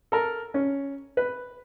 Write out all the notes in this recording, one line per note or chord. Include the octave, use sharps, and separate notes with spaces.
A4 A#4
C#4
B4